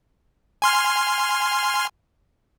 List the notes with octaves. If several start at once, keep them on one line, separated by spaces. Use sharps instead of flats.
G#5 C6 F6